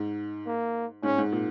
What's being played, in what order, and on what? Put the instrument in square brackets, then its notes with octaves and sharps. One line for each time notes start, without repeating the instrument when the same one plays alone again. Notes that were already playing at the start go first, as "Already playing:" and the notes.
Already playing: [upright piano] G#2
[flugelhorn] A#3
[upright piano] G#2 [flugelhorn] C#4
[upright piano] G#2
A#2